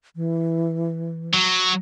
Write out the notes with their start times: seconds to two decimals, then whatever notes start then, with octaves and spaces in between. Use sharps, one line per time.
0.16 E3
1.34 F#3